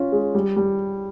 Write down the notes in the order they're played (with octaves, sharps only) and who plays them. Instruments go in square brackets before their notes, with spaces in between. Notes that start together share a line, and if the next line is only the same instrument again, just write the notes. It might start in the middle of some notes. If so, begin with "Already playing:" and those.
Already playing: [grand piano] C#4 F4
G#3
G3
G3